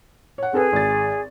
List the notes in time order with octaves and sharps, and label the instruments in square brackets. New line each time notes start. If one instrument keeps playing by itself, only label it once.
[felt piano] C#5 F#5
[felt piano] C4 A4 B4 [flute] G#4
[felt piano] G#1 A6